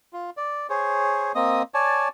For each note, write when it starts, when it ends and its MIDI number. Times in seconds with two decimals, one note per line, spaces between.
0.13 0.30 65
0.37 0.67 74
0.70 1.32 68
0.70 1.32 72
0.70 1.32 73
1.35 1.63 58
1.35 1.63 60
1.35 1.63 75
1.35 1.63 87
1.74 2.08 73
1.74 2.08 74
1.74 2.08 80
1.74 2.08 81